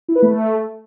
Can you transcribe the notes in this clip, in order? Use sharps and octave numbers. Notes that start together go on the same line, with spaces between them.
E4
B4
A3